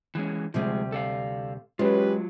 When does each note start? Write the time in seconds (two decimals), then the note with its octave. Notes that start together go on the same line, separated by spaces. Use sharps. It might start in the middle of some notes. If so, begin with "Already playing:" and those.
0.15 E3 G#3 C#4
0.54 D2 C3 F3 G3 G#3
0.92 A4 D5 F5
1.79 F#3 G#3 C#4 F4 G4 B4